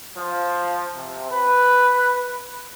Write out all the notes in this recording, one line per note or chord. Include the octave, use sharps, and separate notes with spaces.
F3
C3
B4